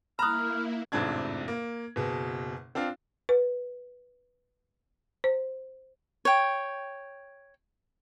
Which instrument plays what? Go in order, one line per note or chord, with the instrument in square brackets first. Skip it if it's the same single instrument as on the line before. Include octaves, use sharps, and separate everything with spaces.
[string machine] A#3 E4 [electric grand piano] A#5 F#6 [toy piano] B5 D#6 [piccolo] F6
[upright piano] A1 F2 G#2 C3 D4 G#6
A#3
F#1 B2 G#4
C4 D4 F4 F5
[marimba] B4
C5
[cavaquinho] C#5 G5